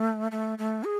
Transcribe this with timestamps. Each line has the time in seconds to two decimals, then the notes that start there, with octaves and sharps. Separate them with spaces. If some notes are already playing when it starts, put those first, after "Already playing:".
Already playing: A3
0.32 A3
0.58 A3
0.84 G#4